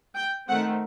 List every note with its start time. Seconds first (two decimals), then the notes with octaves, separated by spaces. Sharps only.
0.15 G5
0.47 D#3 A3 C4 F#5